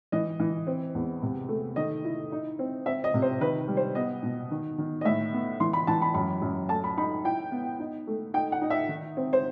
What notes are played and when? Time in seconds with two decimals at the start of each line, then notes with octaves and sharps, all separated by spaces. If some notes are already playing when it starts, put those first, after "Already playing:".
0.12 E3 D#5
0.39 E3
0.67 C4
0.95 E2
1.22 C3
1.49 A3
1.76 D#3 D#5
2.05 E4
2.32 D#4
2.59 C4
2.86 C4 E5
3.04 D#5
3.14 C3
3.22 C5
3.41 D#3 B4
3.68 G3
3.77 C5
3.95 B3 D#5
4.23 B2
4.51 D#3
4.78 D#3
5.01 D#5
5.05 A2 E5
5.33 B3
5.60 E3 C6
5.73 B5
5.87 E3 A5
6.02 B5
6.14 F#2 B5
6.42 F#2
6.69 A3 A5
6.84 B5
6.97 D#4 B5
7.25 E4 G5
7.52 B3
7.80 D#4
8.07 A3
8.34 D#4 G5
8.52 F#5
8.62 D#4
8.70 E5
8.89 D#3
9.17 C4
9.33 C5